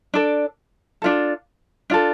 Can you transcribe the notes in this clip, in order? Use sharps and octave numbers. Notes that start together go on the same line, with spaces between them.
D4 A4 D5
D4 F4 A4
D4 F4 A4